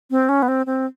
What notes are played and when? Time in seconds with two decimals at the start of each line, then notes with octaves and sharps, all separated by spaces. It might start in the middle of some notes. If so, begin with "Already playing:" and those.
0.11 C4
0.29 C#4
0.42 B3
0.48 C4
0.66 C4